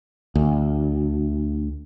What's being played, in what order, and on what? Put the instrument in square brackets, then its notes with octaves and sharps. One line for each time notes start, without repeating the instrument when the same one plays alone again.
[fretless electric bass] D2